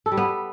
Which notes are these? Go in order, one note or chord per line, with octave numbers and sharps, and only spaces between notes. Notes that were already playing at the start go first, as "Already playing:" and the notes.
A4
G3
B3